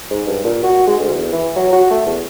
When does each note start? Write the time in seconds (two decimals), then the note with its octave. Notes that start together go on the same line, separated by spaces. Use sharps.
0.11 G#2
0.28 G2
0.44 A#2
0.63 F#4
0.87 G#3
0.99 D2
1.14 E2
1.32 E3
1.56 F#3
1.73 F#4
1.91 A3
2.06 E2